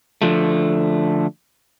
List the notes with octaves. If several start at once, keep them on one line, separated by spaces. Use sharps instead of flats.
D3 F3 A3